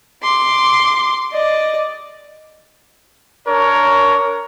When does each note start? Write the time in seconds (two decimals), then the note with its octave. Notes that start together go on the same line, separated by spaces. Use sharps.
0.23 C6 D6
1.32 D5 D#5
3.47 D4 A#4 C#5